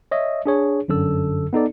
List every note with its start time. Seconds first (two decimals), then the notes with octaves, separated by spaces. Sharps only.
0.11 C#5 D#5 E5
0.46 D4 G#4 C#5
0.88 G1 F#2 D3 A4 E6
1.53 B3 D#4 A4 D5